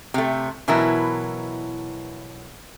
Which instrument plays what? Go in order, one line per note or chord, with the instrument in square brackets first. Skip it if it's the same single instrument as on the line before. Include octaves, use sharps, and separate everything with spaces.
[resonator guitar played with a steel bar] C3 A3
B2 E3 F#3 E4 A#4